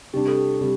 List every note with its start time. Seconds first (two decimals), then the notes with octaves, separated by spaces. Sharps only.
0.13 C3 G3 D4 G4
0.28 A4
0.37 G4
0.61 C3 G3